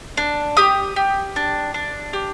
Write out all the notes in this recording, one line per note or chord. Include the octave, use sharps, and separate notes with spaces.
D4
G4 D#6
G4
D4
D4
G4